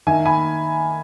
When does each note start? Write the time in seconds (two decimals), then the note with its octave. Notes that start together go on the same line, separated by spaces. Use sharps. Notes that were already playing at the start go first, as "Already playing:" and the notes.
0.07 D#3 E5 G#5
0.25 G#5 B5